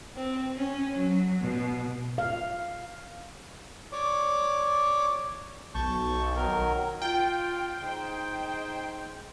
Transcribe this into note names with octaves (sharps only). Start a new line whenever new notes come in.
C4
C#4
F#3
B2
F5
C#5 D5 D6
B1 A5 C#6 G6
D#3 F#3 A#4
F4 G5
D#4 G#4 C5